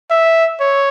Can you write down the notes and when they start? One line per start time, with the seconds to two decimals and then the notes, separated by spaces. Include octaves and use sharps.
0.11 E5
0.60 C#5